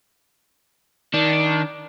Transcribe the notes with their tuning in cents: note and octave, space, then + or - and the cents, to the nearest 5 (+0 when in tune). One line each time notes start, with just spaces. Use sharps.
D#3 +15 D4 +0